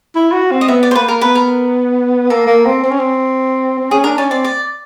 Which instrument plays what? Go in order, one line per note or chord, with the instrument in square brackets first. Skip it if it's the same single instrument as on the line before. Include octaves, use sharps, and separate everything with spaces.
[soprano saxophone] E4
F#4
C4
[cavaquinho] D#5
[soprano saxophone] B3 [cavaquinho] E5
[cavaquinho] D5
C5
[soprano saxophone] A#3 [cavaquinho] B4
[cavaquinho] A#4
[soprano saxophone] B3 [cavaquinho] B4
[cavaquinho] A#4
[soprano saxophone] A#3 [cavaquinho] A4
[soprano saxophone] A#3
C4
C4
C#4
C4
C4
[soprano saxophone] C#4 [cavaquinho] G#4
[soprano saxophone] D4 [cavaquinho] A#4
[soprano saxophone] C#4 [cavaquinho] D5
[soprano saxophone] C4 [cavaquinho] D5
[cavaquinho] D5